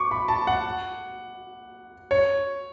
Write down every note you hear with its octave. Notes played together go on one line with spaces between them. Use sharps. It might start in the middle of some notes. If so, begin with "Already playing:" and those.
Already playing: C#6 D6
B5
A5
F#5
C#5